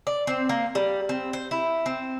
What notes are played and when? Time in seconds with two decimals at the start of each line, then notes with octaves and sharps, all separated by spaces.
0.07 D5
0.27 C4
0.49 A#3
0.75 G3
1.09 C4
1.33 C5
1.51 E4
1.86 C4